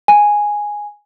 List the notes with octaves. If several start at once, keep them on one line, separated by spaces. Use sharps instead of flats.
G#5